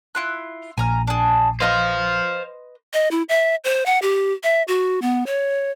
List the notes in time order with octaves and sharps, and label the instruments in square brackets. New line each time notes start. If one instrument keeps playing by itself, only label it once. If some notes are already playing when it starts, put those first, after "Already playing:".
[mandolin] E4 F4 F#6
[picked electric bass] A#1 [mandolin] G#5 A#5 F6
[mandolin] D4 G#4
[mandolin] B4 D#5 C6 [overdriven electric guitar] C5 F5
[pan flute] D#5
E4
E5
C5
F#5
G4
E5
F#4
B3
C#5